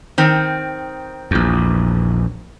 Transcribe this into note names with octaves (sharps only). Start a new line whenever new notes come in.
D#3 C4
A#1 E2